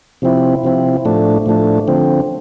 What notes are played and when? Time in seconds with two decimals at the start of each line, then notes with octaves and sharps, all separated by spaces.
0.22 C3 F3 C4 E4
0.64 C3 F3 C4 E4
1.05 A2 F3 A3 D4
1.46 A2 F3 A3 D4
1.88 D3 F3 C4